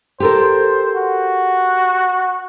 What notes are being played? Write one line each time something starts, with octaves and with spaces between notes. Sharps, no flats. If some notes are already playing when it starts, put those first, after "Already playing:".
G4 A4 A#4 C5
F#4